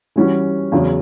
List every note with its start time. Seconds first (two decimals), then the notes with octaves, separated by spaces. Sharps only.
0.16 E3 G3 C#4 F#4
0.72 E2 C#3 F#3 C#4